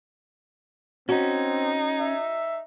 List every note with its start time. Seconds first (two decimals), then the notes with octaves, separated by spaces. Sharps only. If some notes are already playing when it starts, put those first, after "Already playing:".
1.09 C4 C#4 D#4 F#4
2.00 E5